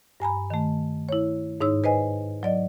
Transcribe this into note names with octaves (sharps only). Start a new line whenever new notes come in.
G2 G#5 A#5 B5
D#3 A3
E4 C#5
G#2 D#4 C#5 E6
B4 C5 D#5 G#5
F#3 D5 D#5